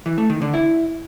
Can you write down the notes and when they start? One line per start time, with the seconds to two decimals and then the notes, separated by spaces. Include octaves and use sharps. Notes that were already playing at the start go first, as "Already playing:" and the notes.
0.06 E3
0.18 A3
0.30 D#3
0.42 D3
0.54 E4